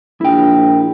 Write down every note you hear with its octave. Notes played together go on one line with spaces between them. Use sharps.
A#1 E4 G5